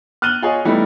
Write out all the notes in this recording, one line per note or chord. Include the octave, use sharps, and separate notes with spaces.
F6 F#6 A6 D#7 F#7 G7
F4 G#4 C#5 D#5
E3 G3 A3 B3 D#4 E4